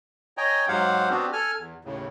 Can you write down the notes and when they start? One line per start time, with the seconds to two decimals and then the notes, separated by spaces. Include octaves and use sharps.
0.37 C#5 D#5 G5 G#5 A#5
0.68 G#2 F#3 G4 C5 F5 F#5
1.11 B3 C4 D4 F#4 G4
1.33 A4 G#5 F6
1.58 E2
1.85 D#2 A2 C#3